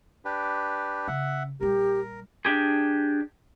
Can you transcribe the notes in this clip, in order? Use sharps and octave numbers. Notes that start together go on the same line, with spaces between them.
D4 G4 B4
C#3 E5 F#5
A#1 G3 G4 A#4
D4 G4 G#4